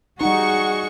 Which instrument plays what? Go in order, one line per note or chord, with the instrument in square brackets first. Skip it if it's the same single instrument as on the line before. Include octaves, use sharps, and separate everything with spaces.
[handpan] G3 D#4 [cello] F#4 G#4 [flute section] F#5 [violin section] C#6